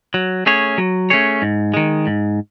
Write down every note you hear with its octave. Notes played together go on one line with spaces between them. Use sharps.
F#3
A3 C#4 G#4 C#5
F#3
A3 C#4 G#4 C#5
G#2
D#3 G#3
G#2